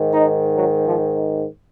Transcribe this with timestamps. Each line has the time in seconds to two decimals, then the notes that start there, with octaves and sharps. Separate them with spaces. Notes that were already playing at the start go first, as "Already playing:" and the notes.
Already playing: G#2 D#3
0.12 D#4
0.56 F#3
0.86 F3